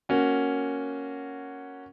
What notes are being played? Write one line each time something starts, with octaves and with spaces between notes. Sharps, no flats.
A#3 C#4 F#4